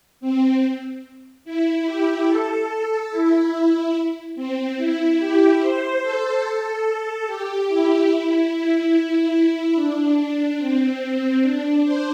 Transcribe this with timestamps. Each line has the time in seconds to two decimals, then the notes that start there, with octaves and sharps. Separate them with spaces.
0.21 C4
1.45 E4
1.86 G4
2.28 A4
3.11 E4
4.36 C4
4.77 E4
5.19 G4
5.60 C5
6.01 A4
7.26 G4
7.68 E4
8.51 E4
8.92 E4
9.75 D4
10.58 C4
11.42 D4
11.83 C5